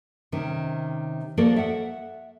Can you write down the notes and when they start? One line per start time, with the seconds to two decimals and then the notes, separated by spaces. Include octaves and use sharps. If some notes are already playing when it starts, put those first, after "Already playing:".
0.32 C3 D#3 C#4
1.37 F3 A#3 F#4 A4 A#4 D5
1.56 E5 F#5